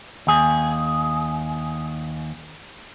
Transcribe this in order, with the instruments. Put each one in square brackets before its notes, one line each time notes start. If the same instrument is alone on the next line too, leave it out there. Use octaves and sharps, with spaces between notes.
[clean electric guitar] D#2 G#4